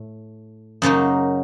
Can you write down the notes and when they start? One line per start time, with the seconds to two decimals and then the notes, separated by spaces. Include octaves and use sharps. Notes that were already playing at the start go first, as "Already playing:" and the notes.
Already playing: A2
0.82 F#2 C#3 F#3 A#3 D#4